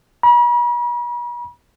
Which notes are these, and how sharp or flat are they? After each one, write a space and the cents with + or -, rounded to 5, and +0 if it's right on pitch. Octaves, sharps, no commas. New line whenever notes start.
B5 -45